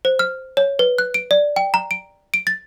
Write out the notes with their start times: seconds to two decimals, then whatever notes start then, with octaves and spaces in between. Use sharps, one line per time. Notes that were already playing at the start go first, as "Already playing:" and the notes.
0.05 C5
0.19 F6
0.57 C#5
0.79 B4
0.98 F#6
1.14 D7
1.31 D5
1.56 G5
1.74 A#5
1.91 D7
2.34 D7
2.47 A6